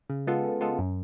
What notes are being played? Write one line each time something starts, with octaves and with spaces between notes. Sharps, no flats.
C#3
G#3 B3 F4 A4
C#3
G#3 B3 F4 A4
F#2